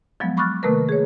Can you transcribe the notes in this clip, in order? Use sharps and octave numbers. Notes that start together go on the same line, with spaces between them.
F3 F#3 G#3 B3
B5 C#6 D6 F6 F#6 A6
C3 D#3 A3 A#3 A#4 B4
G#4 C#5